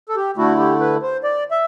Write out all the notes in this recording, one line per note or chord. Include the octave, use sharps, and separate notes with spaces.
A4
G4
D3 A3 E4 F#4
G4
B4
C5
D5
E5